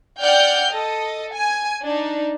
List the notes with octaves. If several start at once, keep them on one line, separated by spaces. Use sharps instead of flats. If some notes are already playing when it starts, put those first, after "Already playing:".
D5 F#5 G5 F6 G6
A4 D#5
G#5
D4 D#4